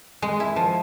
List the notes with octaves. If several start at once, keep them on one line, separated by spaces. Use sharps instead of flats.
G#3
E4
F3